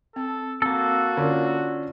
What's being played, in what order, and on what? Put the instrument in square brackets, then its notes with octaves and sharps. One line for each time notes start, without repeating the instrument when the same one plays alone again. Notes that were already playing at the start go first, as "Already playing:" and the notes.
[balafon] C4 [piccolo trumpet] A4
[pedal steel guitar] A#3 A4 [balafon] C4 [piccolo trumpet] F#4
[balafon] D3 [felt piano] C#4 D4 F4